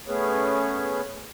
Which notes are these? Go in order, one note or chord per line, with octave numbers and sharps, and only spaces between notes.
A3 B3 C#4 G#4 B4 C#5